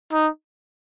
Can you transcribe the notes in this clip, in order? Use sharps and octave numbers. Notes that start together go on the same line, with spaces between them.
D#4